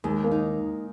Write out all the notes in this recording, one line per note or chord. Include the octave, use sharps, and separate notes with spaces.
D#2 G#3
A#3
D#4